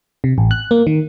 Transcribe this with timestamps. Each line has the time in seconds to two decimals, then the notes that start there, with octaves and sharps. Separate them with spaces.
0.24 C3
0.38 A1
0.51 F#6
0.71 A#3
0.87 D#3